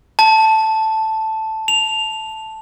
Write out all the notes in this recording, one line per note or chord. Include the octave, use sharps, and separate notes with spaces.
A5
F7